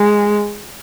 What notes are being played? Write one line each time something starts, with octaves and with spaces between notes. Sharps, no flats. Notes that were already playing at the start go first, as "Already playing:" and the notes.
Already playing: G#3